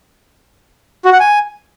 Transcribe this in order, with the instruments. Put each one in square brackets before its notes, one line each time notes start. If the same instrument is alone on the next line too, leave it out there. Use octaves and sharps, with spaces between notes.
[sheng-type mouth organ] F#4
F#5
G#5